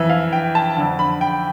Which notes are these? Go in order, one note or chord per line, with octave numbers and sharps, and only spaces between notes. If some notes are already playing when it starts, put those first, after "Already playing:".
Already playing: F2 E3 E5
F5
G5
A5
F2 D3
B5
G5